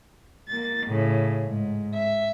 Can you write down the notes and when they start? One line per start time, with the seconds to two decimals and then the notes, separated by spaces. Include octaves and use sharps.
0.49 A#3 A6
0.87 A2 C#3
1.44 G#2
1.93 E5